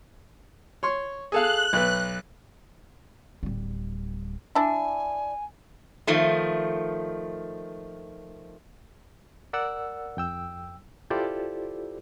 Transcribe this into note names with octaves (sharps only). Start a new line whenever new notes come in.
C#5 C6 C#6
G#4 A4 F5 F#6
B1 B4
D1 G3
D4 E4 G#5
D#3 F3 A3
A#4 D5 F#5 E6
F2 G5 E6
E4 F4 G4 A4 C5 D5